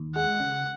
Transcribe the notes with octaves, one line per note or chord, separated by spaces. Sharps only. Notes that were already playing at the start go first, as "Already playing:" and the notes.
Already playing: D#2
G#3 F#5
C#3